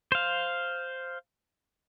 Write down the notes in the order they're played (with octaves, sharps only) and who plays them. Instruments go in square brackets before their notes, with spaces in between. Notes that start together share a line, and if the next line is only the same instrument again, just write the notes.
[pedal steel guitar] C5 F5